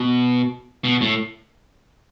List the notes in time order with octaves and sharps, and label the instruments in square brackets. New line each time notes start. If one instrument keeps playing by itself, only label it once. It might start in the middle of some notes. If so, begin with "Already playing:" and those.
Already playing: [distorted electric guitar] B2
B2
A2